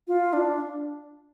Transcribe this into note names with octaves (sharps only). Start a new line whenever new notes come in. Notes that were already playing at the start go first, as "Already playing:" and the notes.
F4
D4